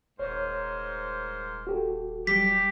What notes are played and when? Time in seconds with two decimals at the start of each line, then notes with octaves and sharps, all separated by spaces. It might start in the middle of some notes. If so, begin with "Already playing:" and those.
0.19 D#1 G#2 A#4 C5 C#5
1.67 F#4 G4 A4
2.27 F#3 G3 G4 B6